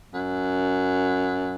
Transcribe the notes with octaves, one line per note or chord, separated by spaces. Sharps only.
F#2